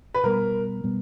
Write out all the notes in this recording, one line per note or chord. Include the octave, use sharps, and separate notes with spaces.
B4
B2 G3 B3 A#4
B2 G3 B3